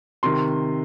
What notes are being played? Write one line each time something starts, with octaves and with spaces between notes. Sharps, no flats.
C3 D#3 C6